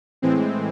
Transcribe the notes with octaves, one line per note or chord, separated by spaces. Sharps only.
A2 E3 G#3 C4